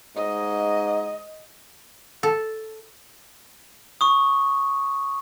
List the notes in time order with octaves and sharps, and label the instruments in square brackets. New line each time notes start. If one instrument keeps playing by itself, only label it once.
[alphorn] G#2 [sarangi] D#5
[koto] A4
[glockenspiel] C#6 D#6